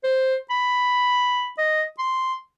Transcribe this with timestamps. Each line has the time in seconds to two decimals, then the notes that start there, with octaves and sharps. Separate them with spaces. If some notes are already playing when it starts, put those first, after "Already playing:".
0.04 C5
0.50 B5
1.58 D#5
1.99 C6